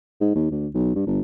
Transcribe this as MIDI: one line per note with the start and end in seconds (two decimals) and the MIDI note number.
0.21 0.31 44
0.36 0.49 39
0.51 0.68 38
0.74 0.91 35
0.95 1.05 43
1.07 1.21 31